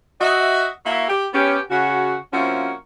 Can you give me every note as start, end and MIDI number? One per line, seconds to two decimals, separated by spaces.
0.21 0.67 66
0.21 0.67 75
0.21 0.67 76
0.85 1.08 58
0.85 1.08 64
0.85 1.08 66
0.85 1.08 76
1.08 1.26 67
1.33 1.59 59
1.33 1.59 61
1.33 1.59 67
1.70 2.15 49
1.70 2.15 66
2.33 2.72 53
2.33 2.72 58
2.33 2.72 60
2.33 2.72 61
2.33 2.72 64
2.33 2.72 66